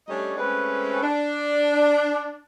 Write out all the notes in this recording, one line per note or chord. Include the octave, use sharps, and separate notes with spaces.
G3 A3 C#4 D4 C#5 D#5
G#3 A3 C4 C#4 B4
D4